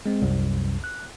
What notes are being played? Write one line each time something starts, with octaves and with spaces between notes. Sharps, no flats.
G#3 C4
C2 F#2
F#6